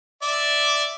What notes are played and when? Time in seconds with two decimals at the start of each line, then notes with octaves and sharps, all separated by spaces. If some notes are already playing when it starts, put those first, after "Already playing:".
0.22 D5 E5